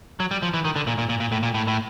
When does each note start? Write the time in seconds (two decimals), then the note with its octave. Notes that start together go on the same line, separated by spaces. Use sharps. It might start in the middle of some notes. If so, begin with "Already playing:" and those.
0.20 F#3
0.31 G3
0.43 F3
0.54 E3
0.65 D#3
0.76 D3
0.87 A#2
0.98 A#2
1.09 A#2
1.20 A#2
1.32 A2
1.43 A#2
1.55 A2
1.68 A2